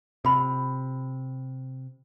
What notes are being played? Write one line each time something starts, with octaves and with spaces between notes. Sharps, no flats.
C3 F4 B5